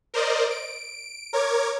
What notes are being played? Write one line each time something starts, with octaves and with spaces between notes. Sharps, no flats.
A#4 C5 D5 D#5
D7
A#4 C#5 D6 G#6